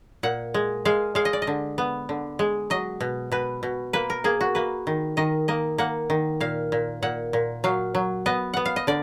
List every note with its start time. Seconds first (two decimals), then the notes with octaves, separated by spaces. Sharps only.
0.23 A#2 F#5
0.54 G#3
0.85 G#3 F5
1.15 G#3 F5
1.25 D#5
1.33 D5
1.42 D#5
1.47 D3
1.78 B3
2.09 D3
2.39 G#3
2.70 F#3 D#5
3.00 B2
3.32 B2 B4
3.63 B2
3.93 A#3 B4
4.10 A#4
4.24 A#3 G#4
4.41 F#4
4.55 A#3 B4
4.87 D#3
5.17 D#3 D#5
5.48 A#3 D#5
5.78 A#3 F#5
6.10 D#3
6.40 A#2 F5
6.72 A#2
7.02 A#2 F#5
7.33 A#2
7.64 F#3 F5
7.95 F#3
8.26 B3 D#5
8.54 B3 F#5
8.65 F5
8.76 D#5
8.87 D3 D5